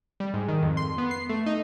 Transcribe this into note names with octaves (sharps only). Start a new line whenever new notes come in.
G3
G#2
D#3
F2
C6
B3
C7
A3
D#4